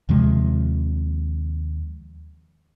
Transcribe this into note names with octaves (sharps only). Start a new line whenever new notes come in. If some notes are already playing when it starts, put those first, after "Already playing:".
D#2 C3 F3 G#3